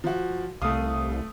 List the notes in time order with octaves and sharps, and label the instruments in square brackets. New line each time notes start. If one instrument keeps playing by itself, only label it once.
[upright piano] F3 F#4
[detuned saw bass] C2 [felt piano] A3 D#6 [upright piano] F5